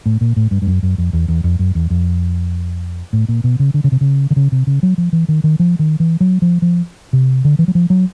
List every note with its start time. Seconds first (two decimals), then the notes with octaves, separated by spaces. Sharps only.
0.06 A2
0.21 A#2
0.36 A2
0.51 G2
0.62 G2
0.67 F#2
0.83 F#2
0.98 F2
1.13 E2
1.28 E2
1.44 F2
1.59 F#2
1.75 E2
1.90 F2
3.13 A2
3.28 A#2
3.44 B2
3.59 C#3
3.74 D3
3.84 C#3
3.92 C3
4.01 C#3
4.30 D3
4.36 C#3
4.52 C3
4.67 C#3
4.83 F#3
4.98 F3
5.13 E3
5.28 D#3
5.44 D#3
5.59 F3
5.79 D#3
6.00 E3
6.20 F#3
6.42 F3
6.62 F3
7.13 C3
7.45 D3
7.59 E3
7.68 F#3
7.75 F3
7.90 F#3